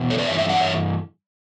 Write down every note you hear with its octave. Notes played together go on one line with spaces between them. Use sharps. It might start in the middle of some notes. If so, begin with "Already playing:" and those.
Already playing: E2 B2
A4 C#5
B4 D5
G2 E3 C#5 E5
C#5 E5
D5 F#5
C#5 E5